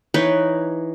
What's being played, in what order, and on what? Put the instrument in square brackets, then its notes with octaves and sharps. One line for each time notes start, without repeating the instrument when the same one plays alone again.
[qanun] E3 D#4 B4 C#5